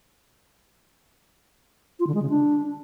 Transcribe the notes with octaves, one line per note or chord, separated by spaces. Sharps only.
F4
D3
G#3
C#3
D4